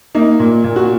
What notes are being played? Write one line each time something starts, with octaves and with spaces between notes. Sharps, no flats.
A#3 D#4
A#2
A#2
F#4